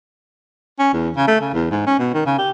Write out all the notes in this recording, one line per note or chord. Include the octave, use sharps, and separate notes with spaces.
C#4
E2
C#3
A3
C#3
E2
G#2
C#4
B2
D#3
C#3
G4